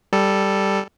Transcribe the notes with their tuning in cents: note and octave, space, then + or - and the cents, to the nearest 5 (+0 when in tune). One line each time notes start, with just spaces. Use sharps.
G3 +0 A4 +0